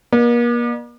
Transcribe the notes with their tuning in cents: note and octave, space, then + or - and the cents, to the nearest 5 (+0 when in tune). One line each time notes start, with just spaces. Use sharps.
A#3 +40 D5 +40